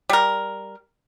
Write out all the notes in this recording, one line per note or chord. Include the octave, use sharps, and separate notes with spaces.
G3 A#4